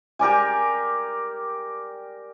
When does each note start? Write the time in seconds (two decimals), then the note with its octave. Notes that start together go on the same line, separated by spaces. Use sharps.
0.19 G4 A#4 D5 G#5